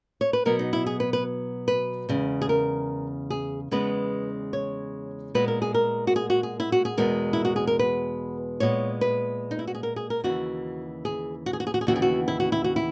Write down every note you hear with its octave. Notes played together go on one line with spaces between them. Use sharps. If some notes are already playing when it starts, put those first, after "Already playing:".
C#5
B4
B2 F#3 B3 A#4
D#4
E4
G#4
B4
B4
B4
E2 C#3 G#3
G#4
A#4
G#4
E2 C#3 G#3 B3 B4
C#5
A#2 G#3 B3 B4
A#4
G#4
A#4
F#4
G#4
F#4
G#4
E4
F#4
G#4
E2 B2 G#3 B3 A#4
E4
F#4
G#4
A#4
B4
A#2 G#3 B3 C#5
B4
D#4
E4
F#4
G#4
A#4
G#4
A#4
D#2 C#3 E3 F#4
G#4
F#4
G#4
F#4
G#4
F#4
G#4
D#2 C#3 E3 B3 F#4
G#4
F#4
E4
F#4
E4
F#4
E4